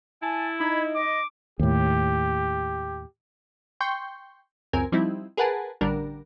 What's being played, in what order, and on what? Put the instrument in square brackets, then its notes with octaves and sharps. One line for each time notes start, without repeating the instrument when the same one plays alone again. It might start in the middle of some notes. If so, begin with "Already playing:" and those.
[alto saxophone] E4 [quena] G#5 [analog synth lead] A5
[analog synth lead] D#4 [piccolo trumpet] B5 [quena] G#6
[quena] D#5 [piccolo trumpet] D6
[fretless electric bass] D#2 A2 [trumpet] G4
[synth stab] G5 C6 C#6 G6
C#2 F#2 C4 A#4 G#5
F3 G3 C4 D#4 E4
G#4 A#4 B4 F#5 G#5 A5
A1 D3 G3 D4 A#4